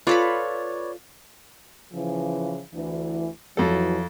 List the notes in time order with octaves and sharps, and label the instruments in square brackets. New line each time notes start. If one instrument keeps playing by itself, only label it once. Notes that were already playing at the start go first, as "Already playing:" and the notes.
[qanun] F4 A4 B5 [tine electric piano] B4 C#5 D5
[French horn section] C#3 E3 F3
D2 E3
[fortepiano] F2 A4 [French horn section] E3 F#3